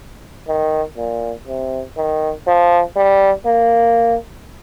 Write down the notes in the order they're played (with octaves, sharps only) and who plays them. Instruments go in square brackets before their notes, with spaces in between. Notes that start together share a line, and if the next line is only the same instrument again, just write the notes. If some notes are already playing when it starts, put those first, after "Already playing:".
[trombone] D#3
A#2
C3
D#3
F3
G3
A#3